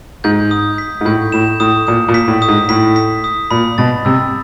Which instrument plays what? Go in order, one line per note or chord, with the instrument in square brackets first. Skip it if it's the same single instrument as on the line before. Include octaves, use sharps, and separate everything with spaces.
[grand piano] G#2 [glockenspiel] G6
[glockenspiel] D#6
B6
[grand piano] G#2
[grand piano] A2 [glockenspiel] G6
[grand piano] A2 [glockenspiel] E7
[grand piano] A2 [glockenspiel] D#6
[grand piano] A#2 [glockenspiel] D#6
[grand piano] A#2
[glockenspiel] B6
[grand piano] A2
[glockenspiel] D#6
[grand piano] G#2
[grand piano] A2 [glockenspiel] B6
[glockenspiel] B6
D#6
[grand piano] A#2 [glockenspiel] B5
[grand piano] B2 [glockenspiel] A6
[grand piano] C3 [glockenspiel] E6